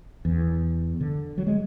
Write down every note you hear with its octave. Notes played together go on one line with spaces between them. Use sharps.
E2
D3
F#3
G#3